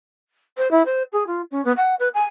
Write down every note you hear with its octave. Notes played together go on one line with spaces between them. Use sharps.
C5
E4
C5
G#4
F4
C#4
B3
F#5
B4
G#5